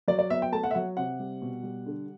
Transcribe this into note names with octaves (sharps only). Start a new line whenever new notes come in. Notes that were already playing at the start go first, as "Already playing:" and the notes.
F#3 D5
D5
B3 E5
G5
A3 A5
F#5
E5
F#3 F#5
C3 F#5
G3
B2
G3
D3